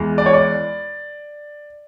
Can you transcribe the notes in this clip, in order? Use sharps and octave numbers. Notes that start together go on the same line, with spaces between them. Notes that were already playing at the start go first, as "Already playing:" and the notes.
Already playing: E2 G#3
D5
C#5
D5